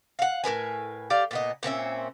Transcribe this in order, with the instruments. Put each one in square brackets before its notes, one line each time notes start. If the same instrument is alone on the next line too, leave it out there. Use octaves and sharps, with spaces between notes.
[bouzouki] F5 F#5
A2 A#4 B4 G#5
G4 D5 F5
A#2 B3 D#5
A#2 C4 C#4 E5